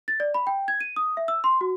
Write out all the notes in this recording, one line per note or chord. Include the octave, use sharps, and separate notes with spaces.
A6
D5
B5
G5
G#6
D#7
D#6
E5
E6
C6
F#4